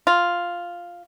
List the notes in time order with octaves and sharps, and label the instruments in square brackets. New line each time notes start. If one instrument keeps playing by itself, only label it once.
[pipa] F4